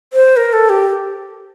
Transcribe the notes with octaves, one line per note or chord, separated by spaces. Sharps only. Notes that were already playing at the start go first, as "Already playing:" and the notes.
C5
A#4
A4
G4